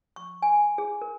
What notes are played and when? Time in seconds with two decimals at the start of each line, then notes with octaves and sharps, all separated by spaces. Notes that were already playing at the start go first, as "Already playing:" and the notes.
0.16 C#6
0.42 G#5
0.78 G#4
1.01 A#4